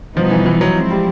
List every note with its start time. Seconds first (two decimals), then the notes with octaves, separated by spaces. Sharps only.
0.16 B2 F3 G3 B3 D#4
0.31 E3
0.46 E3
0.61 F#3
0.76 F3 G#3 C4 E4
0.90 G3